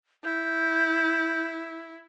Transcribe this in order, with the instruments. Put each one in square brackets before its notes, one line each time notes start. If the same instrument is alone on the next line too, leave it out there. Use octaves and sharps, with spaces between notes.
[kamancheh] E4 [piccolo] G6